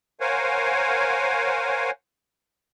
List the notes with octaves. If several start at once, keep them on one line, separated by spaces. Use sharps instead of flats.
A#4 C5 C#5 F5 F#5 G#5